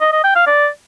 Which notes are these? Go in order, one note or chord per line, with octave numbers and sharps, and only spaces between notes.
D#5
D#5
G5
F5
D5